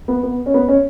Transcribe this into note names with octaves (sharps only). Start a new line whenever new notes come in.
B3
B3
C#4
B3
C#4